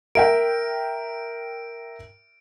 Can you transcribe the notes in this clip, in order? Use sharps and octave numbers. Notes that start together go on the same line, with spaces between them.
A#4 E5 G5 D7